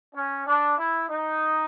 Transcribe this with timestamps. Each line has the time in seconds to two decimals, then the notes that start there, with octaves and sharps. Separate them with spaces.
0.15 C#4
0.47 D4
0.78 E4
1.09 D#4